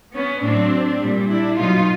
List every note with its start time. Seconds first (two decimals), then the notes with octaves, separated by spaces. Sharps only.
0.13 B3 C#4
0.42 A2 F#3 C4 D4
1.00 A#2 G3
1.28 D4 E4
1.58 B2 F#3 D#4 F4